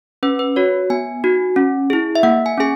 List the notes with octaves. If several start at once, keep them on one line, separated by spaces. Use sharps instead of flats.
C#4 B4
B4
F#4 C#5
B3 G#5
D#4 F#4
C#4
E4 G#4
E5
A#3 F#5
G#5
C#4 G#4 G#5